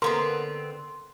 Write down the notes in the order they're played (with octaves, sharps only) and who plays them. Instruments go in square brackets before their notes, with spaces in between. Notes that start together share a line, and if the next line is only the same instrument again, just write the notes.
[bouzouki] D3 B3 C4 [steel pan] A#4 [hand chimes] C6